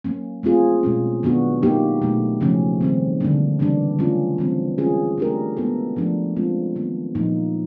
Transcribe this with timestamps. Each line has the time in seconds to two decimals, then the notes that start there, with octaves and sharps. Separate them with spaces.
0.05 F#3 A#3 C#4
0.43 A3 C4 F4 G#4
0.83 B2 G#3 C#4
1.23 D#3 F#3 B3 D4 F#4
1.62 F#3 A#3 D#4 G4
2.02 B2 F#3 A3
2.41 C#3 F3 A3 C#4
2.81 D#3 G3 C4
3.20 D3 G3 A#3 D4
3.59 C#3 E3 G3 A#3 D4
3.99 F#3 A3 C#4 F4
4.38 E3 G3 C4
4.78 G#3 C#4 F4 G#4
5.18 A3 D4 G4 A#4
5.57 G#3 B3 E4 A4
5.96 F3 A3 D4
6.36 G#3 C4 F4
6.76 D#3 F#3 B3
7.15 A#2 F3 A#3 D#4